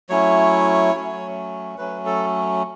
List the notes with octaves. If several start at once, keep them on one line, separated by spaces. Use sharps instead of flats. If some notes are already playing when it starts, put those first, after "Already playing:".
F#3 A3 C#4 E4 C#5
F#3 A3 C#4
F#3 A3 C#4 B4
A4